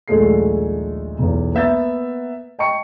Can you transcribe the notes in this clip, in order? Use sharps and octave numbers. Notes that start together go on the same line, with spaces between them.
A#1 D#2 G#3 A3 A4 C7
B1 E2
A#3 B3 E5 G6 A6
D#5 G5 A5 C#6 C#7